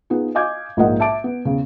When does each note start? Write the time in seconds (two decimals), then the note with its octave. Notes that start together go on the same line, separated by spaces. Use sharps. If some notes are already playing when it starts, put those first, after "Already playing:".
0.10 B3 D#4 F4 G#4
0.35 D#5 F5 G#5 D6 G6 G#6
0.77 A#1 G#2 A#3 A#4 D#5 F#5
1.00 E5 A5 D6 D7
1.24 B3
1.45 E2 C#3